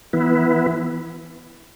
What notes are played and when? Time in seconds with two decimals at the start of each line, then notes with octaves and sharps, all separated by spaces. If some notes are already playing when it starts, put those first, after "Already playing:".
0.13 E3 B3 E4